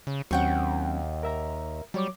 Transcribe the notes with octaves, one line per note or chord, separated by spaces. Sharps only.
C#3
D#2 F#3 C4 C#4 F#5 G5 C#6
A#4 E5 A#5
F#3 G3 C#5 D6